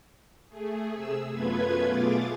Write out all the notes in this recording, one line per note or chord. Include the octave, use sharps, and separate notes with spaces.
A3 G#4
C3 G#4 E6
F#2 A3 B3 F4 B4 G#6
B2 A3 F4 G#4 D6 A6